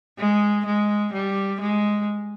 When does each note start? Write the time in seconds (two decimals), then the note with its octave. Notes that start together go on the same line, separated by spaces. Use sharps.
0.18 G#3
0.66 G#3
1.13 G3
1.61 G#3